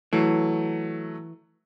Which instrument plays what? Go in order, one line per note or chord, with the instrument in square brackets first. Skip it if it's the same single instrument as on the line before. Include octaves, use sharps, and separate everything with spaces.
[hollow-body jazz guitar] E3 [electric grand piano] F#3 A3